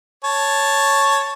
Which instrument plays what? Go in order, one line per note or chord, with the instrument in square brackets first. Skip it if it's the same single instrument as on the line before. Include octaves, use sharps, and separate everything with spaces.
[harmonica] C#5 A5